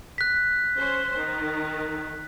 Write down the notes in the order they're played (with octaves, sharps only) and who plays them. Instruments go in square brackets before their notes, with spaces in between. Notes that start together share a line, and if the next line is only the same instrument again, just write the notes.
[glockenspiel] F#6 B6
[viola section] C#4 C5
D#3